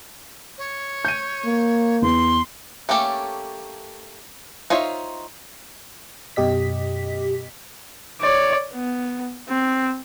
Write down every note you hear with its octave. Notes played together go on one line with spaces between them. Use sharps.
C#5
G6 D#7
A#3
E2 C6
A3 A#3 C#4 G4 A4
D#4 F4 C5 C#5 E5
F#2 B2 G4 D#5 B6
C#5 D5
B3
C4